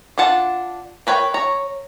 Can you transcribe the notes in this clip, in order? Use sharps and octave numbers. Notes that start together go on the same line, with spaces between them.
D4 F4 F#5 A5
A#4 B4 C#5 G5
C#5 A#5